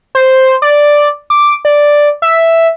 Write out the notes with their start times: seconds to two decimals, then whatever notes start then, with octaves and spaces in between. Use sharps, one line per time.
0.15 C5
0.62 D5
1.30 D6
1.65 D5
2.22 E5